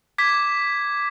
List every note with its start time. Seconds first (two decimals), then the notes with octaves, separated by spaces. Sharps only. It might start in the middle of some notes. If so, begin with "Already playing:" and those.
0.18 D6 G#6 B6